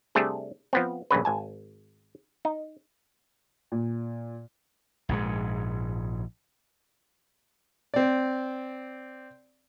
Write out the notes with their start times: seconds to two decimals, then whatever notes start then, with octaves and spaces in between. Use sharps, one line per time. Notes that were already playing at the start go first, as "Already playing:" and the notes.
0.15 C3 G3 A3 D4 G#4
0.73 F3 B3 C4
1.11 A#1 G2 C#3 B4
1.25 G#1 G#5 A5
2.45 D#4
3.72 A#2
5.09 A#1 G#2 D#3 G#3
7.94 C4 D5